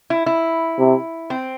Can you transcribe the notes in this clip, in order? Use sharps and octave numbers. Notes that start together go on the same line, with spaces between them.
E4
E4
C3
C4